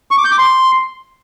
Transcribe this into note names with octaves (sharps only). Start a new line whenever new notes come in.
C#6
D6
G6
D6
C6